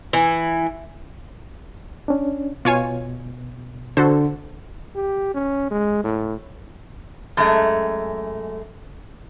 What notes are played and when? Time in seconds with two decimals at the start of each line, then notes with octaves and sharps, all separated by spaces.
0.13 E3
2.08 C#4 D4
2.65 B2 F4 C#5 G#5
3.97 D3 F#4 A4 C5
4.96 G4
5.34 C#4
5.71 G#3
6.04 A2
7.37 F#2 G#3 A3